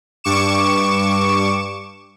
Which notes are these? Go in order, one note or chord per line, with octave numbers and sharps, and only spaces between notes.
G2 C#6 D6 C#7 E7